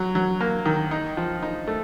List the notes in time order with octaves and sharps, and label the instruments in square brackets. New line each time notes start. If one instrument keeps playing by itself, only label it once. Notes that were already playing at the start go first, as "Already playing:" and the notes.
Already playing: [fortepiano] F#3
F#3
A#3
D#3
D#4
F3
D#4
A3